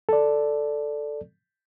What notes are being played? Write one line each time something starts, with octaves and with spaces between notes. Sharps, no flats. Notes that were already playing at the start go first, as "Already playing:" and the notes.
A4 D5